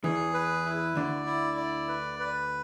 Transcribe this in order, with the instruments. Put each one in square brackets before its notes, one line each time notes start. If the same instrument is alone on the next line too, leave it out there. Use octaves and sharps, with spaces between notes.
[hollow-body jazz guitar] E2 E3 [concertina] G#4
[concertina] B4
E4
[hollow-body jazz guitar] D2 D3 [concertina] D5
[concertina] E4
D5
B4
B4